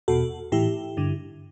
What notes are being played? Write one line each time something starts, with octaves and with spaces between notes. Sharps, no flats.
E2 B2 F#4 A4
A2 E3 E4 G4
G2 D3